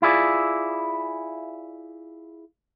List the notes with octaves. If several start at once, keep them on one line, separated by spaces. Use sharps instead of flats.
E4 F4 G#4 D5